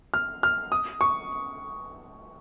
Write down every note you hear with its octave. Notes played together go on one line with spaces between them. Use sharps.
F6
F6
D#6
C#6